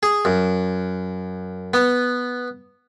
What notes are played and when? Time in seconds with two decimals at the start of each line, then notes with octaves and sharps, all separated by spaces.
0.03 G#4
0.25 F#2
1.74 B3